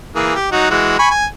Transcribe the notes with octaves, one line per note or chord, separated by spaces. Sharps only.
E3 A#3 G#4
G4
F#3 D#4 F#4
E3 G#3 F#4
G#5 B5 C#6
G#5